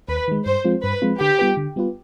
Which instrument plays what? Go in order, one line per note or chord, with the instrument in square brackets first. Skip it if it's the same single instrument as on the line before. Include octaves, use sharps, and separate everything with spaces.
[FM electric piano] D#2 [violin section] B4
[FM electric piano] D#3 G#3
[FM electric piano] G2 [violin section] C5
[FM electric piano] F3 G#3 C4 F4
[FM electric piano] G2 [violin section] B4
[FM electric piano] F3 G#3 C4 F4
[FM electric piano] D3 [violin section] G4
[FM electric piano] G3 B3 F4 B4
D3
G3 B3 F4 B4